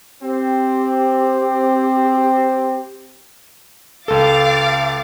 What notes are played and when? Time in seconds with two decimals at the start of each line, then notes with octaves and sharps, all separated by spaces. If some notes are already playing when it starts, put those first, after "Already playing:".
0.23 C4 G4
4.08 C#2 A4 F5 D6 A6